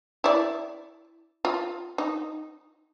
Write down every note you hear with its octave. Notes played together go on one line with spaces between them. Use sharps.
E4 D5
F4
D#4